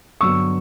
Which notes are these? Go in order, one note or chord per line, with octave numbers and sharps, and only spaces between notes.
G2 D3 F#3 B3 C#6 E6